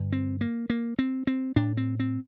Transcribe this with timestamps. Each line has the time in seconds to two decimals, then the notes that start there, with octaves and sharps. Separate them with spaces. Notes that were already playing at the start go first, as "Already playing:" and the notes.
Already playing: G2 D3
0.12 C4
0.41 A#3
0.70 A#3
0.99 C4
1.27 C4
1.56 A2 D4
1.77 C4
2.00 C4